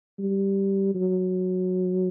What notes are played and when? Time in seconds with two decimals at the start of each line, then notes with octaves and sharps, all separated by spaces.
0.19 G3
0.94 F#3